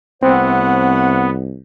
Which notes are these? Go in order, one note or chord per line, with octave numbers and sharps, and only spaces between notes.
C2 A3 B3 C4 C5 F#5